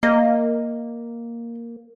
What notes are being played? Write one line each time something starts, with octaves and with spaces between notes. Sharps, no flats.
A#3 D#5